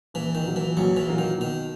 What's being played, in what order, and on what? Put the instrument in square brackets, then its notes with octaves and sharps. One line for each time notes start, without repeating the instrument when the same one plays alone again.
[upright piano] A#1 [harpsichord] E3
[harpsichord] D#3
[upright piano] A#2 F#3 A#3
[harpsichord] E3
[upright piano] A#1 [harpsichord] F#3
[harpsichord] E3
[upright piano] A#2 F#3 A#3
[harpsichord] D#3
[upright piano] B2 [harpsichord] D#3